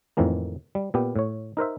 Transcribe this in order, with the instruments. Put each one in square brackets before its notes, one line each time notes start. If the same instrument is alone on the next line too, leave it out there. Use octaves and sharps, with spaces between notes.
[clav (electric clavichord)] F2 A2 D#3 E3 A#3
G3
A#2 B3 G4
A2 C#5
D#4 A#4 C5 E5